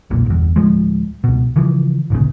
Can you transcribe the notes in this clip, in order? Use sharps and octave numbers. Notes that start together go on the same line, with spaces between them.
F1 B1 A#2
G1 E2
D1 B1 F3 G#3
C#2 B2
C#3 E3 F3
G#1 D2 A#2 C#3